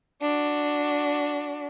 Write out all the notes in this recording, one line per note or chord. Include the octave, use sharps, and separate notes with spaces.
D4 F#4